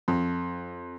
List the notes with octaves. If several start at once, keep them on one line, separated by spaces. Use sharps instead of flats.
F2